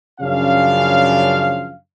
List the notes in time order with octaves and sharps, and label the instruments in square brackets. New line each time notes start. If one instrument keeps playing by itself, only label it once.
[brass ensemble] F#2 C#3 F3 C#4 D4 F5